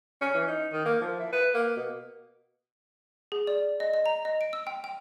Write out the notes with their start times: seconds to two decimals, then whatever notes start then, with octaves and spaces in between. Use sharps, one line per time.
0.21 C#4
0.34 E3
0.48 D#4
0.73 D#3
0.85 A#3
1.01 F3
1.19 E4
1.33 B4
1.54 A#3
1.76 B2
3.32 G#4
3.47 D5
3.80 D#5
3.94 D#5
4.06 A#5
4.25 D#5
4.41 D7
4.53 E6
4.67 G5
4.84 G5